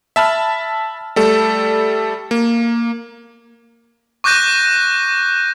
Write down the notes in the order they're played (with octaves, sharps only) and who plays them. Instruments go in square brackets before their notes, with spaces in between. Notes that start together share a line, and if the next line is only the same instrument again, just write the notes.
[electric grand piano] E5 A5 B5 F6
G3 A3 A4
A#3
[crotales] C#6 D6 F#6 G6 A#6 D#7